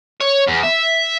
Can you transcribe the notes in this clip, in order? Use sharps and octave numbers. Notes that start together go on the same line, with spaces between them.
C#5
E2
E5